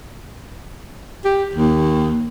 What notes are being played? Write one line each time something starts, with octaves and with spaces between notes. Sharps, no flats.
G4
D#2